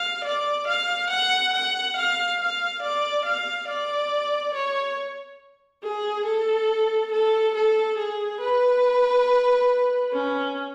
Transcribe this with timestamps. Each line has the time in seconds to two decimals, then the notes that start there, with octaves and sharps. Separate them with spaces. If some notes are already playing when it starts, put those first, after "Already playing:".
Already playing: F5
0.24 D5
0.67 F5
1.10 F#5
1.53 F#5
1.96 F5
2.40 F5
2.82 D5
3.25 F5
3.68 D5
4.54 C#5
5.83 G#4
6.26 A4
7.12 A4
7.55 A4
7.98 G#4
8.41 B4
10.13 C#4